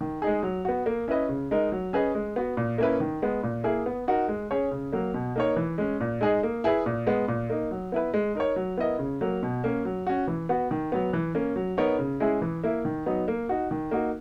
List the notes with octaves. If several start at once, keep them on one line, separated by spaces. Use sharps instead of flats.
D#3
G#3 D#4 G#4
F#3
B3 F#4
A#3
C#4 E4 B4 D#5
C#3
G#3 D#4 A#4 D#5
F#3
C#4 G#4 B4 D#5
G#3
B3 F#4
A#2
A#3 C#4 E4 B4
D#3
G#3 B3
A#2
A#3 E4 G#4
B3
D#4 F#4 A#4
G#3
C#4 G#4 C#5
C#3
F#3 A#3
B2
A#3 D#4 A#4 C#5
E3
G#3 C#4
A#2
G#3 D#4 G#4 D#5
A#3
E4 G#4 B4
A#2
G#3 B3
A#2
A#3 D#4
F#3
B3 E4 B4
G#3
D#4 A#4 C#5
F#3
B3 E4 A#4 D#5
C#3
F#3 A#3
B2
A#3 C#4
F#3
C#4 F#4
E3
B3 F#4
D#3
F#3 B3
E3
A#3 C#4
F#3
B3 D#4 A#4 C#5
C#3
G#3 C#4 E4 G#4
E3
A#3 E4
D#3
F#3 B3 D#4
A#3
D#4 F#4
D#3
A#3 D#4 F#4